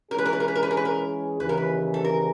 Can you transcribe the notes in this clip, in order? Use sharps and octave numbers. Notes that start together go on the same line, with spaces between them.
E3 G#3 C#4 E4 G#4 A#4
B4
A#4
B4
A#4
B4
A#4
B4
A#4
B4
A#4
D#2 C#3 E3 B4
A#4
B4
A4
A#4